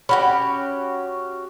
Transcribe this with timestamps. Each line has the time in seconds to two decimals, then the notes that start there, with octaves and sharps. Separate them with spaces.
0.09 C#4 F#4 G4 B5